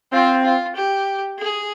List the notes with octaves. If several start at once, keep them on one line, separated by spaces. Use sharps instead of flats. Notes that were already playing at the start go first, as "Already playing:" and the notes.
C4 F4
F4
G4
G#4